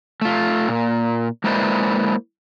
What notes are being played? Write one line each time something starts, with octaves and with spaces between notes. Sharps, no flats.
A3 F4
A#2
G#3 A#3 E4 B4 C5 D5